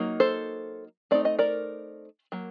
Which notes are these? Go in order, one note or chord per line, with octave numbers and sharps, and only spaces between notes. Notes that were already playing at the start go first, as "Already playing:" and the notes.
Already playing: F#3 A#3 D#4
A4 C5
A3 C4 D#4 D5
D#5
A#4 D5
F#3 A#3